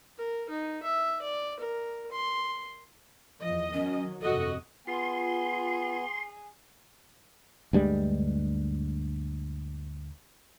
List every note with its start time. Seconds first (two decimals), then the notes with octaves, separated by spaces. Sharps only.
0.18 A#4
0.49 D#4
0.83 E5
1.22 D5
1.59 A#4
2.12 C6
3.41 E2 F3 D#5
3.73 D#3 F#3 C#4
4.22 G1 F2 C3 F#4 A4 D#5
4.87 B3 F4 G#4 C6
7.73 D2 G2 G3 G#3